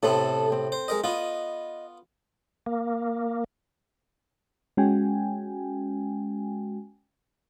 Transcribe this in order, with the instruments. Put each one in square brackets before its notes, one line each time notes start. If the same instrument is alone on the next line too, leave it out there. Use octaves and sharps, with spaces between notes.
[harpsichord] A2 C3 B3 [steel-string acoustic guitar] A4 C5
[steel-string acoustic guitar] C4
[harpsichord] C5
G#3 A#4 D#5
[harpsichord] B3 F4 [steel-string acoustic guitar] D#5
[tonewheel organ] A#3
[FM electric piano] G#3 C#4 F#4 G5 G#5